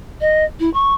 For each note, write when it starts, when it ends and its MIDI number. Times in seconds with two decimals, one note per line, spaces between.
0.21 0.45 75
0.60 0.70 64
0.74 0.94 85